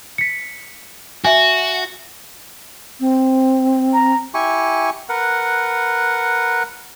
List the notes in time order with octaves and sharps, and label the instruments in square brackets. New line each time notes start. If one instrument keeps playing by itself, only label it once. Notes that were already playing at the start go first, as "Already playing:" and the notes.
[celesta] B6 C#7
[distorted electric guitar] F#4 [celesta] E5 G#5
[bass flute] C4
[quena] A#5
[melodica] E4 G4 G#5 C#6
A#4 B4 F#5